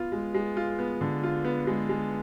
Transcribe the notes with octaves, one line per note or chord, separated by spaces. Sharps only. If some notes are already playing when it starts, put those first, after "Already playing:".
Already playing: B3 F4
G#3
G#3
F4
B3
D3
F4
B3
G#3
G#3